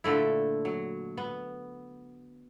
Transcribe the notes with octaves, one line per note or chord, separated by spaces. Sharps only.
A#2 D3 A3 E4
F#3
B3